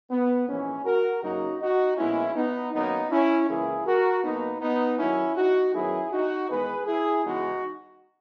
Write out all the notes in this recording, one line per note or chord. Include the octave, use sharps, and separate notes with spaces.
B3
A#1 G#2 E3 C#4
F#4 A#4
F#2 C#3 F#3 A#3 D#4 F#4
D#4 F#4
A#1 A#2 G#3 B3 C#4 E4
B3 D#4
F#2 D#3 F#3 A#3 B3 D#4
C#4 E4
C#2 C#3 E3 A#3 E4 G#4
F#4 A#4
B1 B2 A#3 B3 D#4
B3 D#4
F#2 D#3 F#3 C#4 E4
D#4 F#4
F#2 D#3 F#3 B3 E4 G#4
D#4 F#4
E2 D#3 G#3 B3 G#4 B4
E4 G#4
E2 C#3 E3 G#3 B3 D#4 F#4